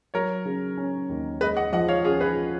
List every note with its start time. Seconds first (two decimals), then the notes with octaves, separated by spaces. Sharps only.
0.14 F#3 A#4 C#5
0.45 C#3
0.77 C#4
1.09 D#2
1.41 G#3 B4 D#5
1.57 D#5 F#5
1.72 F3 D#5 F#5
1.88 C#5 F5
2.04 C#4 F4 G#4
2.20 G#4 B4